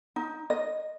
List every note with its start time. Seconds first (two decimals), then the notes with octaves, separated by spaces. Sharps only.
0.16 D#4
0.50 D#5